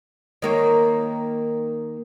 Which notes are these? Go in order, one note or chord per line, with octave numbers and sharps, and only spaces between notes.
D#3 A#3 C#5